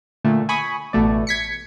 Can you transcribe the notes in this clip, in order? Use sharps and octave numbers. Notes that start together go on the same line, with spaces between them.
A#2 D3 A3
G#5 B5 C#6 D#6
A1 B2 A3 D5
G#6 B6 C#7